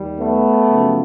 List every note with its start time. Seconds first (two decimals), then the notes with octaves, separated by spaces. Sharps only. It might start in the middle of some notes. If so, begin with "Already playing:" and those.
Already playing: D#2 D#3 G3
0.18 A3 B3
0.68 F#2 C#3 F3